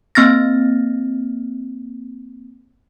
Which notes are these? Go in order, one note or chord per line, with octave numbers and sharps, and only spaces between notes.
A#3 C4 F6 A6 A#6